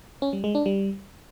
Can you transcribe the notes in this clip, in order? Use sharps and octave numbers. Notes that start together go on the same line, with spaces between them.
C#4
G3
G#3
D4
G3